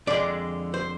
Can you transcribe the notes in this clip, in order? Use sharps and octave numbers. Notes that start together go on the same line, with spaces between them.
F2 D3 G#3 D5
C5